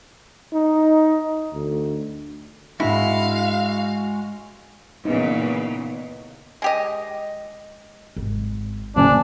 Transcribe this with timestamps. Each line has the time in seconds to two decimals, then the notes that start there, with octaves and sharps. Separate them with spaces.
0.54 D#4
1.53 D2
2.80 G#2 G#3 C4 D4 E4 F#4 F5
5.05 A#2 C#3 E3 B3 D#4
6.62 G#3 G4 D#5
8.16 G#1
8.96 F#1 A#2 D3 D4 G#5